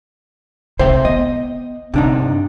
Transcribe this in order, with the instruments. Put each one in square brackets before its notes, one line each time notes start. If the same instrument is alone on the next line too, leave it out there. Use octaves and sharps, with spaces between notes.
[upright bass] C2 C3 [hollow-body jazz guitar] C5 E5 G5
[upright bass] B3 [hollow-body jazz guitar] D#5
[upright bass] G2 [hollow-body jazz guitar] C3 D4 D#4